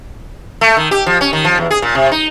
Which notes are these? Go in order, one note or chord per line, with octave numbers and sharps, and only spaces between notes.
A3
D#3
G4
F3
C#4
D#3
F3
E2
G#4
A#2
C3
D#4